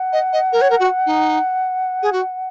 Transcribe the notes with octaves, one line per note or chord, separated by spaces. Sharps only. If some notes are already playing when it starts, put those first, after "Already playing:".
Already playing: F#5
D#5
D#5
A#4
C#5
A#4
F#4
D#4
G#4
F#4